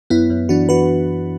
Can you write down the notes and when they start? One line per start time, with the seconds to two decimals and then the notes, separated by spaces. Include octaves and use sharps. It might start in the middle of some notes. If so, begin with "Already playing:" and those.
0.10 F#2 B3 E4
0.30 F#2
0.49 E3 D4 F#4
0.69 E3 F#4 B4